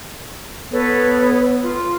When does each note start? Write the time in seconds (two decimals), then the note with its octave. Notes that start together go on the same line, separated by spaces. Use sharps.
0.71 B3 A4 B4 C#5
1.60 F4